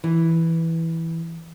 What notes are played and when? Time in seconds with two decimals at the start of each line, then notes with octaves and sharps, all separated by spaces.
0.04 E3